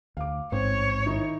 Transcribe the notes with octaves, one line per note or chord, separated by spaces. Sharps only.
D2 F5 D6
A1 G#2 C4 C#5
D#3 D#4 E4